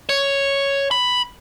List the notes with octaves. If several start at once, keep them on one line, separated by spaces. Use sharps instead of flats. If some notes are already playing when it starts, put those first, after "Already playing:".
C#5
B5